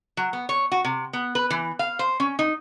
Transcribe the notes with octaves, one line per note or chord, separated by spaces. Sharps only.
F#3
B3
C#5
F#4
C3
B3
B4
E3
F5
C5
C#4
D#4